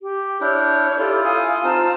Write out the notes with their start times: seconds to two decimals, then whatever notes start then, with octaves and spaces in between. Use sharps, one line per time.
0.01 G4
0.41 D4 E4 C#5 F6 G6
0.99 E4 F4 G4 A4
1.23 F5 G#5 D#6
1.64 C4 D#4 F4 A5 F6